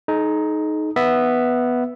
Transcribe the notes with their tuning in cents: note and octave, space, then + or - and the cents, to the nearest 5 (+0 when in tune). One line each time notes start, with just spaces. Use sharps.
D#4 +0 G#4 +45
B3 +0 E5 +0